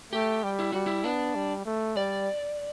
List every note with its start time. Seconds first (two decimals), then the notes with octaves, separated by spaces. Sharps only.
0.13 A3 G4
0.43 G3
0.59 E4
0.72 G3 F#4
0.86 E4
1.04 B3 D4
1.36 G3
1.66 A3
1.97 G3 D5